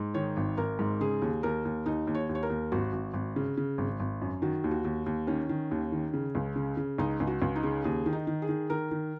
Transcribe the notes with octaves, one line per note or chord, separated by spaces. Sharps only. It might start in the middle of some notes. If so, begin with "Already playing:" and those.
Already playing: G#2
D#3 C#5
G#1
G#1 A#4
G#2
C#3 G#4
D#2
D#2 A#4
D#2
D#2 D#4
D#2
C#5
D#2
C#5
A#4
D#2
G#1 F#4
G#1
G#1
C#3
C#3
G#1
G#1
F#2
D#3 F#4
D#2
F#4
D#2
D#2
D#3 C#4
D#3
D#2
D#3
C#3
C#2
C#3
C#3
C#2 D#4
C#2
F#4
C#2
D#4
C#3
D#2 G#4
D#3
D#4
D#3
G#4
D#3
D#3 A#4
D#3